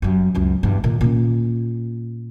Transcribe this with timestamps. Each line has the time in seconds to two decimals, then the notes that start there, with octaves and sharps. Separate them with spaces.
0.02 F#2 G3
0.35 C#2 F#2
0.63 E2 G2
0.84 A#2 D#3
1.01 A#2 C#4